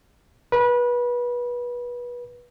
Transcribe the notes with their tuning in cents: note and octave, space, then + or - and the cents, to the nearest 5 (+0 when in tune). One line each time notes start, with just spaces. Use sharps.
B4 -25